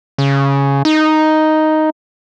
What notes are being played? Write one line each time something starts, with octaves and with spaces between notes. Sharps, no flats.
C#3
D#4